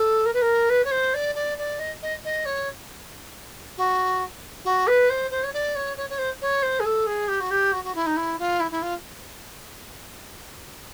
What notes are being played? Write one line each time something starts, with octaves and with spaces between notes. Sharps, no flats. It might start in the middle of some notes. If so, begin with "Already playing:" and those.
Already playing: A4
A#4
B4
A#4
B4
C#5
C5
D5
D5
D5
D#5
D#5
D#5
C#5
F#4
F#4
B4
C5
C5
C#5
D5
C#5
C#5
C#5
C5
C#5
C5
G#4
A4
G#4
G4
F#4
G4
F#4
F#4
E4
D#4
E4
F4
E4
E4
F4